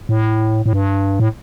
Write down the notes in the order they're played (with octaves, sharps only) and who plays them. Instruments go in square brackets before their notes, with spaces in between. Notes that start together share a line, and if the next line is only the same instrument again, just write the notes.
[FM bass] A2
A2
G2
A2